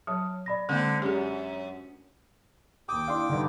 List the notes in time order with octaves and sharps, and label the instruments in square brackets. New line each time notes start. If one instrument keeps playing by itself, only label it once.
[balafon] F#3 [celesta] C#5 A5 D#6
[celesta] D5 B5 A#6
[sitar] D3 C4 [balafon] G#3 A#3
[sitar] F#2 [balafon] G4 G#4
[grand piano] D#2 D#6 [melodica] G5 D6
[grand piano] D4 [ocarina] E4 [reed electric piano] F5 C6
[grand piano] G2 D3 [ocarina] D#4